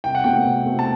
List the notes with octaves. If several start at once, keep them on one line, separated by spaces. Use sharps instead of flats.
C2 G5
F#5
B2 A3 C4 G5
C2
B2 A3 C4
A5